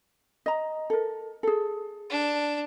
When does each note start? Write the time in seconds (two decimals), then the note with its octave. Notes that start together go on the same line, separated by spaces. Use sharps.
0.46 D#5 A#5
0.90 A4 A#4
1.43 G#4 A4
2.10 D4